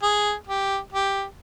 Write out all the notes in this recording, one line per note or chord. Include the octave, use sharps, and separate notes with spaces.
G#4
G4
G4